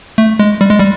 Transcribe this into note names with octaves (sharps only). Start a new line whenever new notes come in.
A3
G#3
G3
G#3
G3